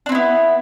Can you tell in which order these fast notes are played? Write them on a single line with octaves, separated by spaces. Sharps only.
D4 C4 E4 B3